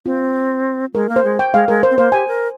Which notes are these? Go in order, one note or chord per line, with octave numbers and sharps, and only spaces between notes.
C4 F4
G#3 A#4
A#3
C5
G#3
G5
G#3 F5
G#3 A#4
C5
C4
A#3 C5
G4 G#5
A#4